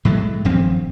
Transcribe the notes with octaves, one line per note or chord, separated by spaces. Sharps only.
A2 F#3 G#3 A3
D#1 G2 F3 C4